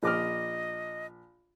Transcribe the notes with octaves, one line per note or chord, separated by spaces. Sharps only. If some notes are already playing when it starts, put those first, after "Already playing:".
A#1 D#5 D6 F6